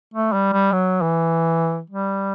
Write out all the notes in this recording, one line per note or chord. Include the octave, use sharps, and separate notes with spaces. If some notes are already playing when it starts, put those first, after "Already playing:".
A3
G3
G3
F#3
E3
G3